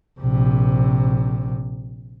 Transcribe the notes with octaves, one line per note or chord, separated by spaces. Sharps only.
A#1 C3